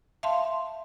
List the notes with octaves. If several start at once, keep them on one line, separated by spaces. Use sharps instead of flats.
E5 F5 A5 C6